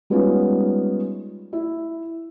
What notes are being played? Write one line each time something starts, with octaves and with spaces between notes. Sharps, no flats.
G3 G#3 B3 C#4 D#4 F4
E4